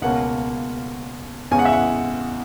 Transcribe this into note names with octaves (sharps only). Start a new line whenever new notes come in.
C#2 B2 A#3 C#4 F#5
E2 C#3 G#3 C#4 G#5
F#5
E5
F#5